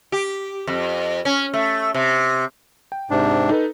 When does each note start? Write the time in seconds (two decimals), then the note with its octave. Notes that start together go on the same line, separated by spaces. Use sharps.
0.12 G4
0.67 F2
1.25 C#4
1.54 A3
1.94 C3
2.92 G5
3.10 G#2 C3 D4
3.49 D#4 A4 B4